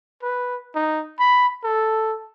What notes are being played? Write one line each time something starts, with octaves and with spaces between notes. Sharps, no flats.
B4
D#4
B5
A4